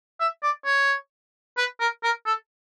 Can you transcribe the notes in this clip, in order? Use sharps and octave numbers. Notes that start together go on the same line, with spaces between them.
E5
D5
C#5
B4
A#4
A#4
A4